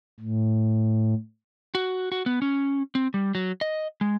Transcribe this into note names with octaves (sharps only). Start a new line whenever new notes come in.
A2
F#4
F#4
B3
C#4
C4
G3
F#3
D#5
G#3